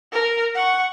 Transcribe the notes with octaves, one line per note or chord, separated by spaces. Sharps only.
A#4
F#5 C#6